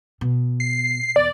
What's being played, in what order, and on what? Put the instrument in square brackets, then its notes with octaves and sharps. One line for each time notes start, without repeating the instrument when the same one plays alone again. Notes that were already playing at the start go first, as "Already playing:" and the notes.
[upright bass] B2
[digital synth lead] C7
[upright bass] E2 [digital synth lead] D5